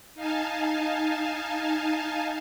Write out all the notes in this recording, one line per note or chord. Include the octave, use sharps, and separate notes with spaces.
D#4 F5 G#5 A5